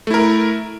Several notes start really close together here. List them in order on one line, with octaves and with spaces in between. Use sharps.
A3 E4 A#4